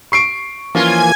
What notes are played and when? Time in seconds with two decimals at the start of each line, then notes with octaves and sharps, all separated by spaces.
0.12 C#6 C7 D7
0.75 E3 F3 A#3 C#4 F4 A#4 G#5 G#6